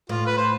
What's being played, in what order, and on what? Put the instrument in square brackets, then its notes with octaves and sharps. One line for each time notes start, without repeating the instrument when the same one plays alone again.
[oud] A2 [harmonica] F4
[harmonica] B4
C5